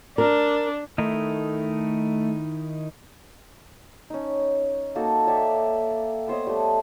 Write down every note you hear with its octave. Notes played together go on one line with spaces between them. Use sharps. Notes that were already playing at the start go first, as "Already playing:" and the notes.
D4 A#4
D#3 A3 D#4 E4
C#4 D#4
A#3 D#4 F#4 A4
C#5 D5 E5 G5
B3 C5 C#5 D#5
G3 A3